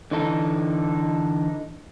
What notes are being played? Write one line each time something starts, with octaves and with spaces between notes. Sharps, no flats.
D3 E3 D#4 A4